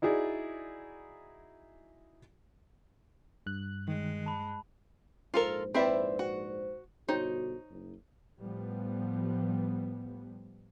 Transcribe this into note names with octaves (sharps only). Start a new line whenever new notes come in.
D#4 E4 F#4 G#4 D5
G2 F#6
D#3 G#3
A5 B5
A#1 G#2 F4 A4 A#4 C5
C4 E4 B4 D5 E5
F#4
G1 B2 D#4 F#4 C5 C#5
F#1
A2 F3 G3 B3